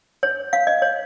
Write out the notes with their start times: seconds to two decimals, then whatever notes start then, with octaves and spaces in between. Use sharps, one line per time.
0.23 C#5
0.53 F5
0.67 D#5
0.82 C#5